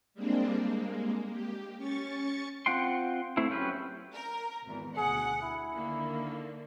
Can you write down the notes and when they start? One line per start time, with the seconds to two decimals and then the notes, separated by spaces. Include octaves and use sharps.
0.14 G3 G#3 A#3 C4 D4
0.66 G#3 A#3
1.30 G4
1.77 C#4 C#6 A6 C#7
2.66 C4 F4 F#5 G5 C6
3.37 A3 C4 E4
3.51 F#3 C#4 G4 G#4 B4
4.14 A#4
4.65 G#1 E2
4.97 D2 B2 G#4 F#5
5.42 E4
5.73 D3 D#3 A#3